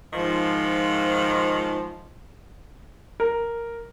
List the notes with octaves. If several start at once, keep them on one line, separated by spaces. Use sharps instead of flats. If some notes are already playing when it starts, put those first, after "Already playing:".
G#2 D#3 F3
A#4